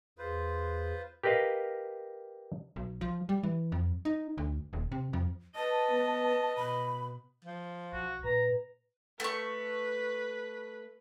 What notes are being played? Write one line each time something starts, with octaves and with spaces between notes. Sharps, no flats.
E2 F4 G#4 B4 C5
G4 A#4 B4 D#5 F5
B1
F3
G3
E3
F2
D#4
D2
D#1
C3
F2
B4 D#5 A5
B3
B2 B5
F3
B1 F#4
A#2 B4 A#5
A3 B4 C#6